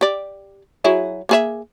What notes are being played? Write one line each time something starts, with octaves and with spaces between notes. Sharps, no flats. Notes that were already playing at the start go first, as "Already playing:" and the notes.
G4 D5
F#3 E4 G#4
A#3 G#4 E5